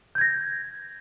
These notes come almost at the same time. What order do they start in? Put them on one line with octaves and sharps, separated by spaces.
G6 G#6 A#6